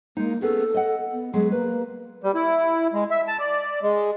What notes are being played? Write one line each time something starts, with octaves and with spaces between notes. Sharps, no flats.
G#3 A#3 D#4
B3 C#4 G#4 A4
D#5 F#5
B3
F#3 G#3 B3 G#4
A#3 B4
G3
E4
G#3
E5
A5
D5
G#3